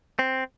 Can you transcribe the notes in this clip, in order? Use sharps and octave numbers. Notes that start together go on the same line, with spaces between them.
C4